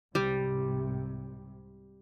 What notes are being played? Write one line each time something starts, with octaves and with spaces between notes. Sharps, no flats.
C2 G#2 C3 G3